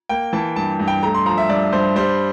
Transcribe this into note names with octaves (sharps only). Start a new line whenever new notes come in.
A#3 G5
E3 A5
G2 A5
G2
G5
A3 A#5
C6
F3 A#5
E5
G2 D5
G2 C5
G3 C5